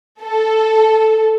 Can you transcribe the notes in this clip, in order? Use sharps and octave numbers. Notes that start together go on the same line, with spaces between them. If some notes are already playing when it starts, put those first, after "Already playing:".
A4